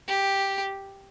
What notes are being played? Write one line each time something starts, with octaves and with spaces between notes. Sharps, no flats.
G4